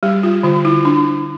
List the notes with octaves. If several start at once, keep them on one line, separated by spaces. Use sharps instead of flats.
G3 G4
F4
D3 F4
E4
D4